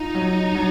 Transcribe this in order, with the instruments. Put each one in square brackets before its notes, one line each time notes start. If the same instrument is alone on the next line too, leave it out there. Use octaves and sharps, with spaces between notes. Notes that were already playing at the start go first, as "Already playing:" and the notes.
Already playing: [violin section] D#4 [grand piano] F4
[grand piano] F#3
F#3